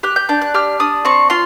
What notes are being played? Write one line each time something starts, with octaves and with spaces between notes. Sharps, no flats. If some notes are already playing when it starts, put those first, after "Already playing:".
G4 F#6
G6
D4 G6
F#6
G4 F6
D4 D#6
C4 C#6
F4 C6